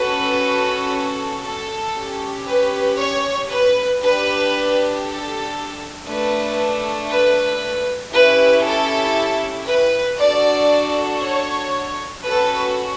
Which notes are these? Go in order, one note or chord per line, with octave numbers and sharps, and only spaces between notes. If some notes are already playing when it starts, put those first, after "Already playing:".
Already playing: C#4 F#4 A4 B4
A4
C#4 G4
B4
C#5
B4
D4 G4 B4
A4
A3 D4 A4 B4
B4
C#4 E4 G4 B4
A4
B4
D4 F#4 A4 D5
C#5
C#4 F#4 A4 B4